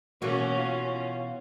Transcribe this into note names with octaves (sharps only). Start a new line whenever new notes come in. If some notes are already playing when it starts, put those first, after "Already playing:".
B2 E3 A#3 C#4 F#4
F4